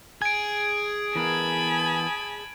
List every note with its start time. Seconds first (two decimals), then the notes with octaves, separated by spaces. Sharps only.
0.22 G#4 G#6 D7
1.16 E3 B3 A#4 G#5 A5 B5